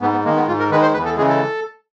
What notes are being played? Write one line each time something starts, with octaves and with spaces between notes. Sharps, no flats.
G#2 B3
B3
D#3 G#3 A#3
B3
G#2 F4
A#4
D#3 G#3 B4
C5
E2 B4
A4
C#3 E3 G#3 G#4
A4